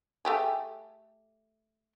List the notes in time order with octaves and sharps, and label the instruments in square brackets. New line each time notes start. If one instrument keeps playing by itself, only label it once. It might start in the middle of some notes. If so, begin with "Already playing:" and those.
[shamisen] A3 G4 G#4